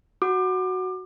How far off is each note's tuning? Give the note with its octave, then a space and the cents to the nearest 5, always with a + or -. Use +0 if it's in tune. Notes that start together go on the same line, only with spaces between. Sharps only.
F#4 +0 D6 +30